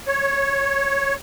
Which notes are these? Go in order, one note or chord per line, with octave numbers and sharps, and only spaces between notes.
C#5